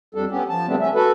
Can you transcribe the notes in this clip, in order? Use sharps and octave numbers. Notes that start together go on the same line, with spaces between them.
F2 G3 D4 A4
B3 C#4 G4
F3 A5
C#3 G3 A3 B3 C4 D4
C#4 E5
F#4 A4 B4